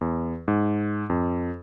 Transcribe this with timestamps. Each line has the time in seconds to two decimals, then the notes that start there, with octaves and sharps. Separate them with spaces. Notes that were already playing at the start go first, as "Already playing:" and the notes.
0.01 E2
0.48 G#2
1.10 F2